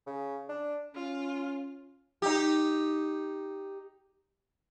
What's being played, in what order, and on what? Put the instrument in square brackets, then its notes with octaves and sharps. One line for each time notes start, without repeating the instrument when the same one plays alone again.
[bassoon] C#3
D4
[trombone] C#4 [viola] F4
[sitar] D#4 G4